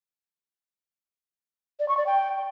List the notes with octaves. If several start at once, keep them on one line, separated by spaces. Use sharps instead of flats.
D5
C#6
D5
G5